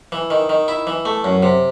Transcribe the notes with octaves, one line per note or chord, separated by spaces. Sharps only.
E3
D#3
D#3
E4
E3
A3
F#2
C3